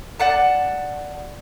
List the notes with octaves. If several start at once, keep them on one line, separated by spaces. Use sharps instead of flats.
D5 F#5 A5